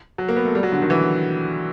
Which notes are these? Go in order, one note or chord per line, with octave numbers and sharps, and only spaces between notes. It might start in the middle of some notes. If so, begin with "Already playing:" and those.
F#3
A#3
B3
A3
G3
F#3
D3
D#3
E3